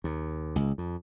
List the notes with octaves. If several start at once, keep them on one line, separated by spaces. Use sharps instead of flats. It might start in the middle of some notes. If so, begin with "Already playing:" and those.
D#2
C#2
F2